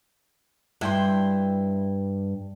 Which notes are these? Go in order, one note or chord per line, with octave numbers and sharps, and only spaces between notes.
G2 E4 G5 C6